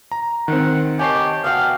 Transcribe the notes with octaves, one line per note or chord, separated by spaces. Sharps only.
A#5
D#3 C4 F#5
D#3 G4 C#5 F#5 G#5 A5 C7
B3 F#4 F5 G5